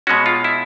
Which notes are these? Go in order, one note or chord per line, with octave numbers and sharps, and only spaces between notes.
B2 G#3 C#4 F#4
F4
E4